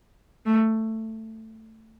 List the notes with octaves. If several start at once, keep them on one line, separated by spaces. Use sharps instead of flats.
A3